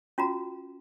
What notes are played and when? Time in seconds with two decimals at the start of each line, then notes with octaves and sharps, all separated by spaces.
0.18 C#4 F4 F#4 A#5